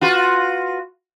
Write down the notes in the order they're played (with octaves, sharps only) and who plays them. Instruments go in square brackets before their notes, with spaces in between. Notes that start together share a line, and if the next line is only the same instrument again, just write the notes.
[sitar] F4 F#4 B4